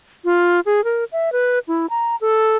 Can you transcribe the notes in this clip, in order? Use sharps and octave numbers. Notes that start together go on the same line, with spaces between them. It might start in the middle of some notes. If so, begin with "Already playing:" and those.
F4
G#4
A#4
E5
B4
E4
A#5
A4